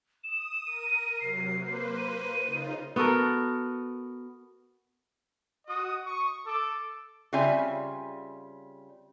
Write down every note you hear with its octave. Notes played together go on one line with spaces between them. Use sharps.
D#6 E7
A#4 D#7
C3 F#3 C7
A#3 B4 C5
D#7
C#3 D#4 F4
B3 F#4 A4 A#4
F#4 D#5 D#6
C#6 D#6
A4 D6
C#3 G3 C4 F4 E5 G#5